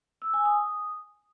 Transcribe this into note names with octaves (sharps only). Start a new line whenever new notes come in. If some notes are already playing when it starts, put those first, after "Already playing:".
E6
G#5
D#6